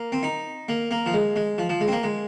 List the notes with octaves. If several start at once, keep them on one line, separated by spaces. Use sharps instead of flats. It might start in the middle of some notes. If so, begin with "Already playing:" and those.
Already playing: A#3
C4
D#4
A#3
A#3
F3
G#3
G#3
F3
F3
G#3
C4
A#3
G#3